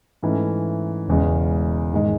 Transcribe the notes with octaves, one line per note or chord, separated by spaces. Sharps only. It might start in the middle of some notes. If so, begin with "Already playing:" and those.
G#2 E3 A3 C#4
E1 E2 C#3 G#3
G#2 D#3 G#3